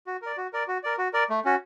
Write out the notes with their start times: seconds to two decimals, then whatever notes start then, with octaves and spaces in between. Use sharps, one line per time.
0.07 F#4
0.22 A#4 D5
0.37 F#4
0.53 A#4 D5
0.68 F#4
0.83 A#4 D5
0.98 F#4
1.13 A#4 D5
1.30 A3
1.45 C#4 F#4